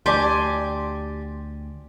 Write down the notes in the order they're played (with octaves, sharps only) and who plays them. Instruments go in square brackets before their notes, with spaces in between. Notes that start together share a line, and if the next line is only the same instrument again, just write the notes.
[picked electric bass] D2 [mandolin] G4 G#5 C6 [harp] D5 A5